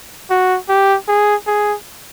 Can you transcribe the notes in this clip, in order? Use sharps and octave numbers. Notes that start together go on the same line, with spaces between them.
F#4
G4
G#4
G#4